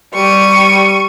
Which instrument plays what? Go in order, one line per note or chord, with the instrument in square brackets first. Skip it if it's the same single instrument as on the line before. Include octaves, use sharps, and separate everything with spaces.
[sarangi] G3 [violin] C#6 D#7